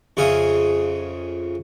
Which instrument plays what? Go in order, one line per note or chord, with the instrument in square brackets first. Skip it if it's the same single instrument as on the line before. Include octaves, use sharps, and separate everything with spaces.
[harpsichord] F2 C#3 F4 G#4 E5 D#6